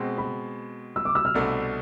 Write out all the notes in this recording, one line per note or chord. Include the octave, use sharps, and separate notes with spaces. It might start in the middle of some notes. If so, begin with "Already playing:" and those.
Already playing: B2 G#3 C4
B5
E6
D6
E6
F6
C2 B2 A3 D4